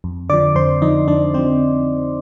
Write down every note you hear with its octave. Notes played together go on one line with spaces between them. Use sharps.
F2
D3 F3 D5 D6
F2 C5 C6
D3 F3 D#4 D#5
F2 D4 D5
D3 F3 C4 C5